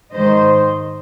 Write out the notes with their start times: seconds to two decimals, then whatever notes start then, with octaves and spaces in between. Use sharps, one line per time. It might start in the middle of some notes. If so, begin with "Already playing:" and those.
0.12 G#2 D#3 C5 D#5